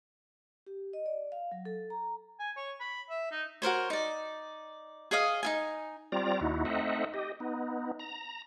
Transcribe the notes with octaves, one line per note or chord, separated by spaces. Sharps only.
G4
D#5
D5
F5
F#3
A4
A#5
G#5
C#5
B5
E5
D#4
F#4 A#4 C5 C#5
D#4 D5
G#4 C#5 D#5 F5
D#4 F4 G#5
G3 C4 F4 D5 A#5
D#2 D#4 E4 F#4
A3 C4 D#4 D#5 E5 F#5
G4 D#5
B3 D#4
A#5